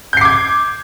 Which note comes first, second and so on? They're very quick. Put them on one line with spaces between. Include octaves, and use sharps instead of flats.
G6 C7 D6 G#6